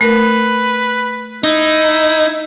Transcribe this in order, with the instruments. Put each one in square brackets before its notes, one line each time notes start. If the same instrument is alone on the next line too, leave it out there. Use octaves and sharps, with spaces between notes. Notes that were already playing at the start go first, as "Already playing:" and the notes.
[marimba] A3 A#4 [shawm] B4
[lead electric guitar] D#4 [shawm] E4